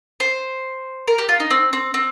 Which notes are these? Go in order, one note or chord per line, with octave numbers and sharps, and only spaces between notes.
C5
A#4
G4
F4
D#4
C4
C4
C4